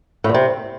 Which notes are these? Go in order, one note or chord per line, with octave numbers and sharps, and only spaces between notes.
A2
E2
C3